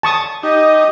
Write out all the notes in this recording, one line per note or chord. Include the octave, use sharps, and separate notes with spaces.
A5 C#6 D#6
D#4 G4 D#5